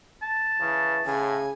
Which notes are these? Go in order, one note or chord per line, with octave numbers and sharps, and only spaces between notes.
A5
C#3 E3
A2 C#3 G#5